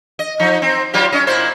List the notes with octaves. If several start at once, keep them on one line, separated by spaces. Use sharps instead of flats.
D#5
F3 D#4
C4
F#3 F4 G4
C#4 D#5
A#2 E4 C5